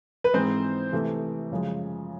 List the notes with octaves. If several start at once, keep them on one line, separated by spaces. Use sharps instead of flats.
B4
G#2 E3 G#3 C4 C5
C3 E3 A3
F#2 C#3 F3 G#3